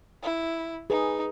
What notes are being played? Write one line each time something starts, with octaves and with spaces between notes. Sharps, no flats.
E4
D#4 G#4 B4